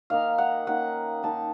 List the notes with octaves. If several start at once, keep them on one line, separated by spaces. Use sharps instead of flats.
D#3 A#3 D#4 F5
F#5
D#3 A#3 C#4 F#5
D#3 A#3 D#4 A5